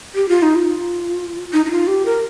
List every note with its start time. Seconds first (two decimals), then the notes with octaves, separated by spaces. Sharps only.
0.15 G4
0.29 F4
0.42 D#4
0.55 F4
1.53 D#4
1.66 D#4
1.71 F4
1.87 G4
2.06 A#4